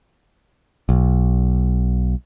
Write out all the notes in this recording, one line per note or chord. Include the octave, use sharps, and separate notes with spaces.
B1